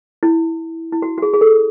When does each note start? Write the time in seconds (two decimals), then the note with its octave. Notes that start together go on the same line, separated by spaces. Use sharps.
0.23 E4
0.93 E4
1.02 F#4
1.18 F#4
1.22 G#4
1.33 G#4
1.41 A4